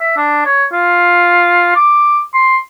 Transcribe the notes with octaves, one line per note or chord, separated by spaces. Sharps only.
E5
D4
C#5
F4
D6
C6